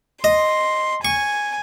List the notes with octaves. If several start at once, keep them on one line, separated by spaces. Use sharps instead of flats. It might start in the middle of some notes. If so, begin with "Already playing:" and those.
D#5 C6
G#5 C#6